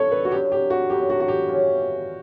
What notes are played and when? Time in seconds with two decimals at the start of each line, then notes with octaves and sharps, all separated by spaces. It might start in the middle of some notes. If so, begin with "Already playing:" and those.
Already playing: D3 G3 C#4 A4 C#5
0.12 B4
0.25 F#4
0.31 F#2 D3 F#3 G4
0.52 G4
0.70 F#4
0.90 F#2 D3 F#3 G4
1.10 F#4
1.20 F#4
1.28 G4
1.48 C#3 E3 G3 C#4